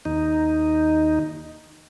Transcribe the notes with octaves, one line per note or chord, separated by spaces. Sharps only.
D#2 D#4